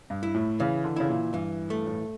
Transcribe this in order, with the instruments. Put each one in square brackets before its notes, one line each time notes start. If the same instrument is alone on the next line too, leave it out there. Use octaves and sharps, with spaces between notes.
[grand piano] G2
[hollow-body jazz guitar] E4
[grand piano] A2
[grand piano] C#3 [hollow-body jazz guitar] E3
[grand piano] D3
[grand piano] C#3 [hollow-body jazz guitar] E4
[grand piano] A#2
[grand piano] G2 [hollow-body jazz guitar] E3
[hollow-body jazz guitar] A3
[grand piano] A2